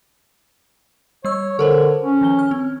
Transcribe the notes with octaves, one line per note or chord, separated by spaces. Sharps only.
G3 C#5 E6
D3 A4 A#4 C5
C#4
D#3 F3 G7
F6
C4